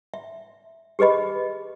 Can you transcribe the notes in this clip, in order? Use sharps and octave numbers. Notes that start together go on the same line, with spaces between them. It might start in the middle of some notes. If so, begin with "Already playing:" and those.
E5
G4 G#4 B4 D#5 B5